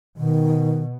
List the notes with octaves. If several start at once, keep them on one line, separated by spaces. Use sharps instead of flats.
B2 D#3